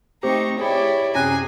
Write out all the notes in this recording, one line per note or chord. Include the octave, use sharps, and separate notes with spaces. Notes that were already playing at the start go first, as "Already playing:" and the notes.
A3 C4 D#4 G4 C5 A#5 C#6
E4 G4 G#4 C#5 D5 B5
F#2 C3 C#4 G#4 G#5 F#6 A#6